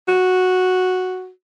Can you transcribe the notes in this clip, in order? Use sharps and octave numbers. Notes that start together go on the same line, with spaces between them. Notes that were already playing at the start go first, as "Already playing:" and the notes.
F#4